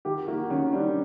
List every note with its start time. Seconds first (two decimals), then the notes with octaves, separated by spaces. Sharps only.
0.05 D#3 G4
0.28 A#3 F#4
0.50 D#3 C#4
0.72 G3 D4